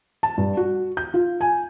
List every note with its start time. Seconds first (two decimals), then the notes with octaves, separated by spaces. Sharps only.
0.23 A5
0.38 G2
0.57 F#4
0.97 G6
1.14 F4
1.41 G#5